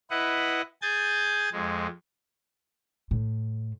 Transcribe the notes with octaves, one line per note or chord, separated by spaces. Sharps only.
E4 B4 D#5 F#5
G#4 G#5 G6 A6
F2 G#3
A2